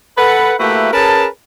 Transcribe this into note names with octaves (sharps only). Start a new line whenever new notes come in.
A4 B4 F#5
A3 A#3 E4 F#4 G4 B4
C#4 G#4 A#4 B4 A5